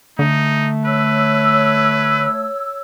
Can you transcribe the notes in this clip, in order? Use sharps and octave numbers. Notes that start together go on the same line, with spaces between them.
D3 A3 D#4
B4 C#5 E6